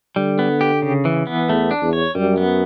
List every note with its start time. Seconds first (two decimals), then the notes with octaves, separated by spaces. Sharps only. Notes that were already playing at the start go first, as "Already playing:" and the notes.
0.16 D3 G3
0.39 B3
0.61 G4
0.82 C#3
1.05 E3
1.27 B3
1.49 E2 A3
1.71 D4
1.82 E2
1.93 C#5
2.15 F#2 G3
2.37 B3